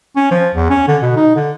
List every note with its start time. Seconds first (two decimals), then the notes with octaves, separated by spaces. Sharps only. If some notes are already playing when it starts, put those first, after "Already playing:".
0.16 C#4
0.31 F3
0.55 E2
0.70 C#4
0.88 D3
1.03 B2
1.16 D#4
1.36 D3